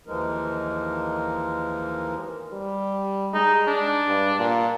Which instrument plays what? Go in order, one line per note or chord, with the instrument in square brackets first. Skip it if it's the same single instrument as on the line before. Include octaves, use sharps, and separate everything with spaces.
[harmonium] D#2 E3 F3 G#3 D#4 A#4
[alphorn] G3
[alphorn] G#3 [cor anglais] D#4
[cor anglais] D4
[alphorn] G2
A#2